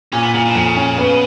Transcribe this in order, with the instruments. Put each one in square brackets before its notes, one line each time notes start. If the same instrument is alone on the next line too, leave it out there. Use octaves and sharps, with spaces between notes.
[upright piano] A#2 [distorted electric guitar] C#4
[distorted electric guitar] B3
[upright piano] A#2 [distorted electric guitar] C#3
[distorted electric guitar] B2
[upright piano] F2 [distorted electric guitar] C#3
[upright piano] C#4
B3